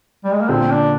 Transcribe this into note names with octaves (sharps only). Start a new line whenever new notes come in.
G3
G#3
A#3
A#2 D3 C4
D4